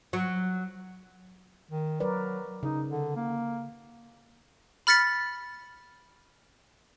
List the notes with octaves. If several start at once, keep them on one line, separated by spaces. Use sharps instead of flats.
F#3
D#3
F#3 A#4 B4 D5
C#3 D#4
D3
A#3
B5 F6 A6 B6 C#7